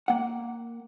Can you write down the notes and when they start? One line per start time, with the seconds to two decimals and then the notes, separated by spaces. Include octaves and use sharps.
0.08 A#3 F#5